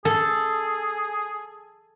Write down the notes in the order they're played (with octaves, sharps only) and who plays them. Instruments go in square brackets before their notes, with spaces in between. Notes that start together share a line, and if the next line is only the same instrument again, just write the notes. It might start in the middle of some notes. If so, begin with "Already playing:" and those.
[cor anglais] G#4 [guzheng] A4